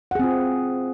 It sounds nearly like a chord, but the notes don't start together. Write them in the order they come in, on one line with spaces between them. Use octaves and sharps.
F#5 G#4 C4 F4